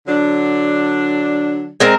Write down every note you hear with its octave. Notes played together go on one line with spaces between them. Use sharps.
D3 F#3 D4
G#3 C4 A#4